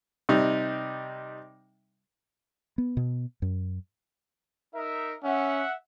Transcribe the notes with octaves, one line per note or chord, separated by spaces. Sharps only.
C3 G3 D#4
B3
B2
F#2
D#4 A#4 E5
C#4 E5 F#5